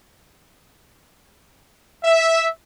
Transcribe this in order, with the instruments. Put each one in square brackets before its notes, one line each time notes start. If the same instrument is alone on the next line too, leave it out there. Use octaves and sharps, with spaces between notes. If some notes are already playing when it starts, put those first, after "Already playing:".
[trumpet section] E5